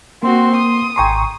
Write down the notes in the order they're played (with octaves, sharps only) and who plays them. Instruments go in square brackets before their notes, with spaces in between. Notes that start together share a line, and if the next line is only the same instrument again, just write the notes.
[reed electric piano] A#3 [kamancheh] C4 F#4 [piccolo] C6
[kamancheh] D#6
[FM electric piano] G#1 C#6 C7 [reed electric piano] G5 A#5 C6 [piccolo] G#5